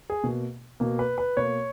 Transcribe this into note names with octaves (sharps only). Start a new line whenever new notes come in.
G#4
B2 A#3
B2 A#3
B4
B4
B2 A#3 C#5